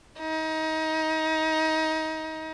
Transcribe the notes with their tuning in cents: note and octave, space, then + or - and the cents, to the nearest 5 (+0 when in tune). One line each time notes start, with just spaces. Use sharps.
D#4 +25